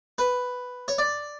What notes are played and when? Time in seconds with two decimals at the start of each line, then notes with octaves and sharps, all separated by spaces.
0.18 B4
0.88 C#5
0.98 D5